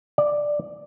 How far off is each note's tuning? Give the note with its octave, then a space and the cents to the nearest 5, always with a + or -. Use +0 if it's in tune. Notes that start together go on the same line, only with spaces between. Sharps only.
D5 +5